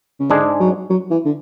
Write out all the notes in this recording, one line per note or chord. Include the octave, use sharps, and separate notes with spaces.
C#3
G#2 D3 G#3 D4 G#4
F#3
F#3
E3
D3